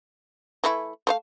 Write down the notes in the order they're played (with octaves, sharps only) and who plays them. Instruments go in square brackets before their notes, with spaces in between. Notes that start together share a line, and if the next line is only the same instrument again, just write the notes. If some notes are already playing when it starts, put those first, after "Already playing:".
[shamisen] E3 A3 E4
A3 C5 F5